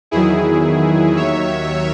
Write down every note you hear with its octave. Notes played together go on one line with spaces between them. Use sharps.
E2 D#3 F#3 E4 G#4
D#2 D#3 F#3 C#5 E5